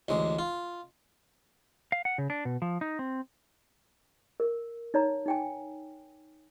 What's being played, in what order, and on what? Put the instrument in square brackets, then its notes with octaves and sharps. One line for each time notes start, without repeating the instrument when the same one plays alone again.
[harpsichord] A1 D2 G#3
F4
[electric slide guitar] F5
F#5
C#3
D4
B2
F3
D#4
C4
[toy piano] A#4
D#4 C#5 A#5
D#4 G5 G#5